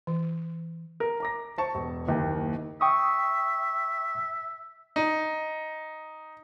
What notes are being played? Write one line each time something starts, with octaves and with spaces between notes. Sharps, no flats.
E3
A#4
A#5 D6 A#6
C5 A5 C#6
E1
F#1 D#2 G5
E5 G5 C#6 D#6
D#4